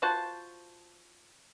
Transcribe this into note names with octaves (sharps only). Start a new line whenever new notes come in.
F4 F#4 C5 A5